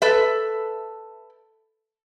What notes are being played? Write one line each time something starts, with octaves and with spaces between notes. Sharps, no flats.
A4 B4 E5